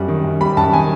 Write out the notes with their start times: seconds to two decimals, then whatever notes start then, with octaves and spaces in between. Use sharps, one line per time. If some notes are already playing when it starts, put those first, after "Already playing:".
Already playing: F#2 G3
0.08 D#3
0.24 F#2
0.41 G3 B5
0.57 F#2 A5
0.73 D#3 G#5